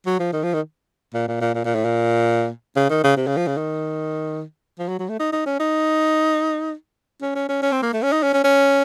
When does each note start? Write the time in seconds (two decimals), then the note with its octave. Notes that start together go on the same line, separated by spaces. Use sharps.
0.06 F#3
0.19 F3
0.33 D#3
0.43 F3
0.53 D#3
1.14 A#2
1.28 A#2
1.41 A#2
1.55 A#2
1.65 A#2
1.75 A2
1.85 A#2
2.76 C#3
2.90 D#3
3.03 C#3
3.17 C3
3.27 C#3
3.37 F3
3.47 C#3
3.57 D#3
4.79 F3
4.88 F#3
4.99 F#3
5.09 A3
5.19 D#4
5.32 D#4
5.46 C#4
5.60 D#4
7.22 C#4
7.35 C#4
7.49 C#4
7.62 C#4
7.72 C4
7.83 A#3
7.93 A3
8.02 C#4
8.12 D#4
8.23 C#4
8.33 C#4
8.44 C#4